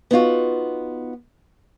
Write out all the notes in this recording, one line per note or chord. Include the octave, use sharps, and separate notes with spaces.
B3 D#4 F4 F#4